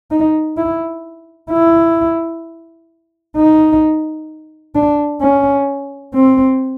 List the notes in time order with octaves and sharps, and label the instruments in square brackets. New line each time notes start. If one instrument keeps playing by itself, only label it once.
[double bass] D#4
E4
E4
D#4
D4
C#4
C4